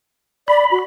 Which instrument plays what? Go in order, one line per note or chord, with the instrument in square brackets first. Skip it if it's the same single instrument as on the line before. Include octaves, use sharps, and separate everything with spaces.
[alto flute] D5 [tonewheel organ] B5
[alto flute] F#4